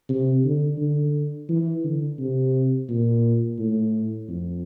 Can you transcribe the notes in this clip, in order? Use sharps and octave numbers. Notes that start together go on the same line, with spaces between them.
C3
D3
D3
E3
D3
C3
A#2
A2
F2